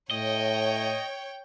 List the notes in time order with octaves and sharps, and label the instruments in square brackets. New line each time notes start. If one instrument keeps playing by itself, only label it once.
[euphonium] A2 [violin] C#5 G5 [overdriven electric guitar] D#5